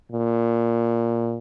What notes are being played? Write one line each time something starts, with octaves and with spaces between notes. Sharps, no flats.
A#2